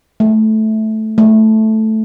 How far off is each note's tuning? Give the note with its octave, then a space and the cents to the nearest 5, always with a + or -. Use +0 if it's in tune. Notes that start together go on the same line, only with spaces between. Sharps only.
A3 -10
A3 -5